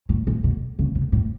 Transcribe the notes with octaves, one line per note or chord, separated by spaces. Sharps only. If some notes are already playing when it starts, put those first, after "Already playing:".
A2
A#2
B2
C#3
C3
A2